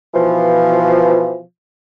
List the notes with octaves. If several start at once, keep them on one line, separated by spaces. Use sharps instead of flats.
B2 E3 F3